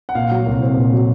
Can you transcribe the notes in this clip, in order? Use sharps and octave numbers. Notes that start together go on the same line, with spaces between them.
F#5
A#2 F5
F#3
C2
C4
A#2
F#3